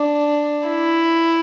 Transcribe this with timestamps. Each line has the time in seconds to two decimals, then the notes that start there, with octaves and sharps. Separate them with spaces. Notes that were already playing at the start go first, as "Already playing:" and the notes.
Already playing: D4
0.68 E4